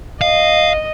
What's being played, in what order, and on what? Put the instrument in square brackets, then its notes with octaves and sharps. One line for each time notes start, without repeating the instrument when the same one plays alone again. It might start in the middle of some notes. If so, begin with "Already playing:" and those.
[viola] D#5 [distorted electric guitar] F5